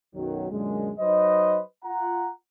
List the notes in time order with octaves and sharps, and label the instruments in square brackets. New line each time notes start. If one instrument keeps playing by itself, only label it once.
[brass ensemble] B1 F#2 D#3 F#3
F#2 A#2 D3 G#3
F#3 D#4 B4 C5 D#5
F4 F#5 A#5